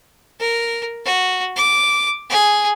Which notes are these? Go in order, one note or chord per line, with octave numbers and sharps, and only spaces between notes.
A#4
F#4
D6
G#4